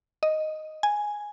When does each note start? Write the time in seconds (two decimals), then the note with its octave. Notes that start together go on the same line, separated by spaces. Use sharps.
0.23 D#5
0.83 G#5